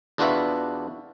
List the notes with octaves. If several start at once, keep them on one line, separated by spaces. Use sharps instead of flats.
E2 D4 F4 F#4 B4 E5